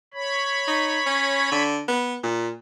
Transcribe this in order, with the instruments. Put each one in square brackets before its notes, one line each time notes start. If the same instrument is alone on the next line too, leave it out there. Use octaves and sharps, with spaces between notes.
[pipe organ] C#5 B5
[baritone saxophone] D#4
C#4
D3
B3
A#2